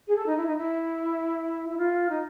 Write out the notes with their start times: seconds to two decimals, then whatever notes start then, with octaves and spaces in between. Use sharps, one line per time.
0.07 G#4
0.16 A4
0.26 D#4
0.37 E4
0.47 D#4
0.57 E4
1.69 E4
1.78 F4
2.09 D#4